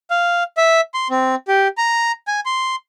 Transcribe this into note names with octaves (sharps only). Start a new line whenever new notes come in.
F5
E5
C6
C4
G4
A#5
G#5
C6